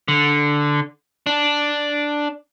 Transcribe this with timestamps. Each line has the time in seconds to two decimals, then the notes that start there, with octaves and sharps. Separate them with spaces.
0.08 D3
1.26 D4